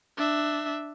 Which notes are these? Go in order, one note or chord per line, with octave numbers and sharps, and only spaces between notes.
D4 E5